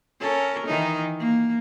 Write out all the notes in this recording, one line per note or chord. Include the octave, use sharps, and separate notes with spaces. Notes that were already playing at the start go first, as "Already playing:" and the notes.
C#4 A4 A#4
D#3 E3 D#4
A#3